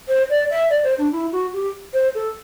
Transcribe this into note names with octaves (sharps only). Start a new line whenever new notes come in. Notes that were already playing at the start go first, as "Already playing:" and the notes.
C5
D5
E5
D5
C5
D4
E4
F#4
G4
C5
A4